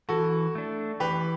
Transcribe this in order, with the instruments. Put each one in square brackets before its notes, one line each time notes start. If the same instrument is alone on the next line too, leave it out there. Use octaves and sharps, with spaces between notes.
[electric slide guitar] E3 [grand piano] F#4 A4
[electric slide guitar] A3 D4
[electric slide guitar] E3 [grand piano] G4 B4